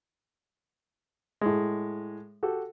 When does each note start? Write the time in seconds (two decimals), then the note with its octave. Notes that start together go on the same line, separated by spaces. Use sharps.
1.41 A2 G#3
2.43 F#4 G4 A4